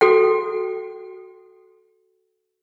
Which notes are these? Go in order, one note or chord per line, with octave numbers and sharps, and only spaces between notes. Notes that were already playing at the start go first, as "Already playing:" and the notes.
F#4 A4 G5